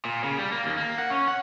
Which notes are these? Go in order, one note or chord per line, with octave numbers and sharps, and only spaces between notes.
A#2
C#3
G3
A#3
D#2
A#3
F#5
C#4
F#5